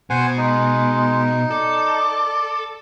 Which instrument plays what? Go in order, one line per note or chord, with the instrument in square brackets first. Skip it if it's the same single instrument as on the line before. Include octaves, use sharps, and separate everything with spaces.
[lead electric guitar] B2 [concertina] C5 F#5 G#5
[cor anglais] G#3 [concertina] D#4
[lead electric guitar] A4 [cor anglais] D5